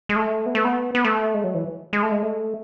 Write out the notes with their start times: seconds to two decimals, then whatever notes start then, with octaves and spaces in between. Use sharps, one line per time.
0.09 G#3
0.16 A3
0.46 B3
0.55 A3
0.65 B3
0.95 B3
1.05 A3
1.34 G#3
1.44 F#3
1.54 E3
1.93 G#3
2.03 A3
2.12 G#3
2.23 A3